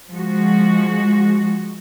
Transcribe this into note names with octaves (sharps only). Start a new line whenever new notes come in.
F3 G#3 F#4